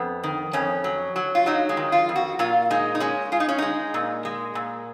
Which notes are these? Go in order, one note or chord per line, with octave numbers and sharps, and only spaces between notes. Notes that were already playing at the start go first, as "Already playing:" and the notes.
Already playing: F2 B3
D#3
F2 C#4
F#3
F#3
F4
F#3 D#4
G#3
D#3
F4
F2
F#4
A#2 F4
G#3 D#4
D#4
G#3 C#4
G#3 F4
D#4
C#4
G#3 D#4
A#2
G#3
A#2